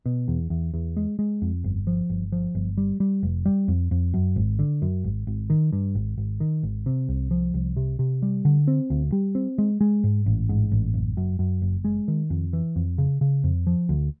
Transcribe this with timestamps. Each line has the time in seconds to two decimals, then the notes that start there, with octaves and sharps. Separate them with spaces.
0.06 B2
0.28 E2
0.50 E2
0.74 E2
0.97 G#3
1.19 G#3
1.42 F2
1.64 G1
1.87 F3
2.10 G1
2.32 F3
2.55 G1
2.77 G3
3.00 G3
3.23 F1
3.46 G3
3.68 F2
3.91 F2
4.14 F#2
4.36 G#1
4.59 D3
4.82 F#2
5.04 G#1
5.27 G#1
5.50 D#3
5.72 G2
5.95 G#1
6.18 G#1
6.40 D#3
6.63 G#1
6.86 C3
7.09 C2
7.31 F3
7.54 C2
7.76 C3
7.99 C3
8.22 G3
8.45 D3
8.68 C4
8.90 D2
9.12 G3
9.35 C4
9.58 G#3
9.81 G#3
10.04 G#2
10.26 A1
10.49 G#2
10.72 A1
10.94 F#1
11.17 F#2
11.39 F#2
11.62 F#1
11.85 G#3
12.08 D#3
12.30 F2
12.53 E3
12.76 F2
12.98 C#3
13.21 C#3
13.44 F2
13.67 F3
13.89 D2